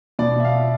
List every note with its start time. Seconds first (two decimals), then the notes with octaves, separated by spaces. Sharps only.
0.19 B2 D5
0.40 E5
0.45 F5